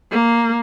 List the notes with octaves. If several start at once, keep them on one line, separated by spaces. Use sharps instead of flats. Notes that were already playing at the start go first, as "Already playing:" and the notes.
A#3